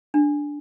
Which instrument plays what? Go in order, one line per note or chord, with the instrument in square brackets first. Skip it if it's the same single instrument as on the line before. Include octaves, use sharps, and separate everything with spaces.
[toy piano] D4